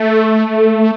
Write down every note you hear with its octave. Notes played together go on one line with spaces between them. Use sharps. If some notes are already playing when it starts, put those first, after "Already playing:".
Already playing: A3